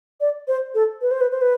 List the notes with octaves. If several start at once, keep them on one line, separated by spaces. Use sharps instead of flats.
D5
C5
A4
B4
C5
B4
C5
B4